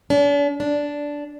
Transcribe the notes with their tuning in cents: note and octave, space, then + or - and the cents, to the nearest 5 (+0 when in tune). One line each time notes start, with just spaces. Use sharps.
D4 -45
D4 -10